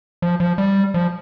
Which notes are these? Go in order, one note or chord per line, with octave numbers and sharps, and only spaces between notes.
F3
F3
G3
F3